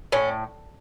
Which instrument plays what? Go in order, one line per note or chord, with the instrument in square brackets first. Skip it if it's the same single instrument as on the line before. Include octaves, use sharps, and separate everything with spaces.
[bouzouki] A2 C#4